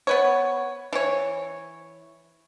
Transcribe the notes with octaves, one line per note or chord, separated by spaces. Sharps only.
B3 B4 C#5
E3 C#5